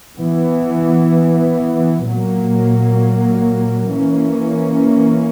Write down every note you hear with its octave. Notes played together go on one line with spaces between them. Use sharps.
E3 B3
A#2 F#3 A#3
E3 A#3 C#4